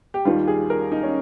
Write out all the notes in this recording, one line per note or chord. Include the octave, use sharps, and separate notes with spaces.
G4
D#2 D#3 G3 F4
G#4
A#4
D#4
C#4